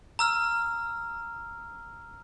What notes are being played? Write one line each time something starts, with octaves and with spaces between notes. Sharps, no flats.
A#5 E6 F6